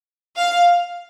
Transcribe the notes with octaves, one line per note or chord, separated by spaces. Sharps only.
F5